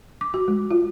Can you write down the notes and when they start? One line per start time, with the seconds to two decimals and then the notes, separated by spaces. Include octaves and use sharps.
0.21 D6
0.34 F#4
0.48 G#3
0.71 F4